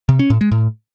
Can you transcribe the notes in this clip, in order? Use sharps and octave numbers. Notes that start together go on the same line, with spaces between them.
C3
C#4
A2
G#3
A2